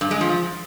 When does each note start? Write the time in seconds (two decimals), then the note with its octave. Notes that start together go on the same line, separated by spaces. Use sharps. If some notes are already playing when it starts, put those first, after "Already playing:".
0.01 G2
0.11 G#3
0.21 F3